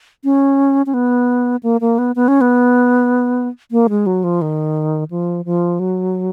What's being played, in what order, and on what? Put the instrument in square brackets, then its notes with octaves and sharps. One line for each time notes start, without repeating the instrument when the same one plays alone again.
[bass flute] C#4
C#4
B3
A#3
A#3
B3
B3
C#4
B3
A#3
G#3
F#3
F3
D#3
F3
F3
F#3